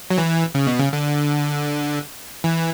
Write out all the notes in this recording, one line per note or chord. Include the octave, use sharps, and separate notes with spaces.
F#3
E3
C#3
B2
C#3
D3
E3